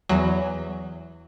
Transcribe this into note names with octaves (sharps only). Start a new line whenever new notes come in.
E2 F#3